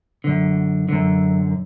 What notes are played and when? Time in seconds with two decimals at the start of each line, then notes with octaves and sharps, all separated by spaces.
0.24 F#2 D3
0.89 F#2 D3